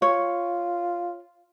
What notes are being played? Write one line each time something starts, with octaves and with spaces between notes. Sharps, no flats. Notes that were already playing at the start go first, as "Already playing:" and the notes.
F4 C#5